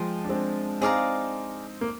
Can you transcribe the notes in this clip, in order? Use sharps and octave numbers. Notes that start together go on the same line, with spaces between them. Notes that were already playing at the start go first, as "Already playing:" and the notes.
Already playing: F3 G#3 G5 C6 D#6
D4
G#3 C4
C4 D#4 G#4 D5 F5 A#5
A#3